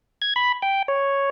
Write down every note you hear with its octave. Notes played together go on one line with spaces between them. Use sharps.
G#6
B5
G5
C#5